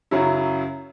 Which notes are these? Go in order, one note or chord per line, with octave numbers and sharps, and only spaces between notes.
F#2 C#3 F#3 E4